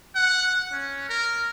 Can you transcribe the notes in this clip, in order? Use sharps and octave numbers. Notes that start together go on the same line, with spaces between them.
F#5
C#4
A#4